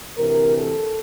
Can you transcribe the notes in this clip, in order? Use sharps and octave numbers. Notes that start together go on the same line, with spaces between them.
D2 C3 E3 A#4
A4